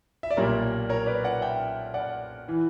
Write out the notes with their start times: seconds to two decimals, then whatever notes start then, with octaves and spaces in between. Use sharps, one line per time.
0.23 E5
0.31 D5
0.37 B1 A#2 G3 A#3 A#4 C#5
0.90 A#4 C#5
1.06 B4 D5
1.24 D5 F#5
1.41 E5 G5
1.94 D5 F#5
2.48 E3